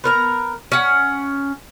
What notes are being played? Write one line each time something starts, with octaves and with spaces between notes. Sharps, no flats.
B3 A#4 A#5
C#4 F#5